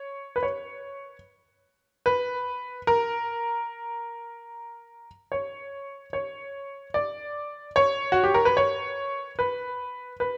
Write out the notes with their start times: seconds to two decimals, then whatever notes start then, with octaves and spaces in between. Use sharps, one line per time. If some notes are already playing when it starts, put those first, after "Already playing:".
Already playing: C#5
0.36 B4
0.43 C#5
2.06 B4
2.87 A#4
5.32 C#5
6.13 C#5
6.94 D5
7.76 C#5
8.12 F#4
8.24 G4
8.34 A#4
8.45 B4
8.57 C#5
9.39 B4
10.20 B4